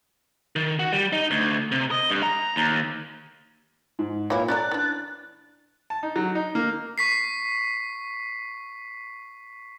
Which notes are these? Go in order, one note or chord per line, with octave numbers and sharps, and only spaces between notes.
D#3
F#4
G3
D#4
D2
C3
D#5
G2
A#5
D#2
G#2
A#2 E3 E4 C#5 F5 D6
C#4 A4 A#4 D5 F#6 A6
E3 D4
A5
D#4
F#3
D#4
A#3
C#6 B6 C7